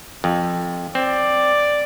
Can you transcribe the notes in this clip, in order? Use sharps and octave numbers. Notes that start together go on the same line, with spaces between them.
F2
C4 D5